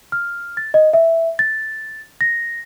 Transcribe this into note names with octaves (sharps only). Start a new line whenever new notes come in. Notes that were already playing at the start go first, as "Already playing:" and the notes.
F6
A6
D#5
E5
A6
A#6